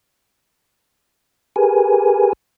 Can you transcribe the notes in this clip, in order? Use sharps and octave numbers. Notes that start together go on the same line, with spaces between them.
G4 G#4 A#4 B4 G#5